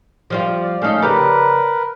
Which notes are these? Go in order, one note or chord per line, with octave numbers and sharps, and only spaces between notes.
F3 G3 F4
D5
A3 C#4 D#4 F5
C#3 G4 A#4 B4 D5